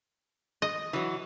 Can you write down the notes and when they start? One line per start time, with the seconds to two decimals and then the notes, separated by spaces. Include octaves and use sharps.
0.62 D#5
0.93 E3 F#3